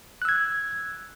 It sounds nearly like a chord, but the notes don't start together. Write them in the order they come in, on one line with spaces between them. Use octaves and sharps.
F#6 E6 G#6